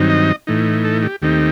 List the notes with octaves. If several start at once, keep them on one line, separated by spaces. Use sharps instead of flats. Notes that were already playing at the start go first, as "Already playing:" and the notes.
Already playing: G2 D#3 F#3 C4 D#4
D#5
A2 E3 A3 D#4
A4
G4
D#2 D#3 A3 C4 D#4 G4